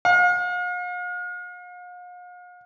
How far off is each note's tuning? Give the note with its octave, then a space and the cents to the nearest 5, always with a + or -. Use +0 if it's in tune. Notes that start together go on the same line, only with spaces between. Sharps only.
F5 +45